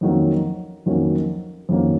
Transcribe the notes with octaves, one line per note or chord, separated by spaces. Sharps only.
F2 D#3 F#3 A#3 C#4
F2 D#3 F#3 A#3 C#4
F2 D#3 F#3 A#3 C#4